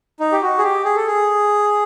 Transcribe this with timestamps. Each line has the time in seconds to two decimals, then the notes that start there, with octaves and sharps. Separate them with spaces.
0.20 D#4
0.32 G4
0.42 F#4
0.58 G#4
0.63 G4
0.84 G#4
0.96 A4
1.07 G#4